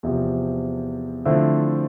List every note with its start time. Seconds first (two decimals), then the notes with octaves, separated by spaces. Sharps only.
0.03 E2 C3 F3
1.25 D3 F3 A3 C4 E4